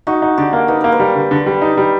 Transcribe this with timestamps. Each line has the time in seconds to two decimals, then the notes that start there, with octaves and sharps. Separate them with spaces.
0.07 D#4 F#4
0.22 D#4
0.38 D3 G4
0.53 A#3
0.68 D#4 B4
0.81 A#3 A#4
0.92 B4
1.00 G3
1.15 D3
1.31 D3
1.46 G3
1.62 D#4
1.77 G3